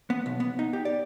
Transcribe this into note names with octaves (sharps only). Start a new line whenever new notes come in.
B3
B1
B3
D#4
G4
D5